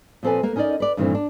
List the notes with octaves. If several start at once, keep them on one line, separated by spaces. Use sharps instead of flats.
A#2 F3 C4 A4 B4 G#5
A#3 A#4 B4
C#4 D#4 A#4 C5 D5 D#5
B4 D5
G2 A#2 D#3 E3 A3 C4
D4